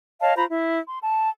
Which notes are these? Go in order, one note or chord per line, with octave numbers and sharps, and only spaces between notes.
C#5 D#5 F5 A5
F4 C5 A#5 B5
E4
C6
A5